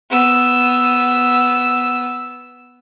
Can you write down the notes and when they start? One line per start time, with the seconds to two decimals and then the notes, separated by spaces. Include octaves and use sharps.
0.10 B3 E6